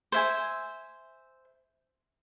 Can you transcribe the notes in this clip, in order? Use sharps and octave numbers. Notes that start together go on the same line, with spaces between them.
C5 E5 G#5